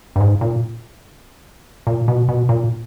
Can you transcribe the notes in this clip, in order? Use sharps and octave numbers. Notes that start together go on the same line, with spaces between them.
G2
G#2
A#2
A#2
B2
B2
A#2